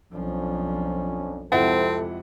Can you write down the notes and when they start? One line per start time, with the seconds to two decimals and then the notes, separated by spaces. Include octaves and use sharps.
0.13 B1 F2 F3 C#4 D4
1.52 F2 C3 G#3 C4 E4 A4 F#5